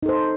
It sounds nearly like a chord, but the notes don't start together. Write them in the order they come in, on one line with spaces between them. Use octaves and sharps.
D#4 A4 C5